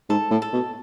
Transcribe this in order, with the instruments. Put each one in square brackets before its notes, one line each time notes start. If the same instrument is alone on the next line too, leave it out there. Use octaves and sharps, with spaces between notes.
[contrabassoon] G#2 [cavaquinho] A4
[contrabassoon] A2
[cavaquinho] A4
[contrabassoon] B2